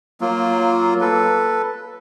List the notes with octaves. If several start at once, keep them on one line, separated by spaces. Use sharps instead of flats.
F#3 A#3 F4
A4 B4